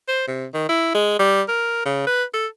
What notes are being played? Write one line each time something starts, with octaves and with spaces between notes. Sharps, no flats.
C5
C3
D#3
E4
G#3
G3
A#4
C#3
B4
A4